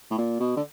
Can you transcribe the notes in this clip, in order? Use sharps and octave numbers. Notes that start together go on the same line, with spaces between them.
A2
A#2
B2
D3